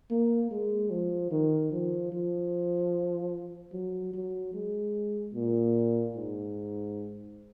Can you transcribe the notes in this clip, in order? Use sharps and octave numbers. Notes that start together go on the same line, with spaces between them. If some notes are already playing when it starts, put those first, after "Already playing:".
A#3
G#3
F3
D#3
F3
F3
F#3
F#3
G#3
A#2
G#2